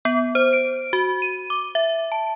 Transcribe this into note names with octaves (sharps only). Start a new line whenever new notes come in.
B3
C5
D7
F#4
D#7
D6
E5
A5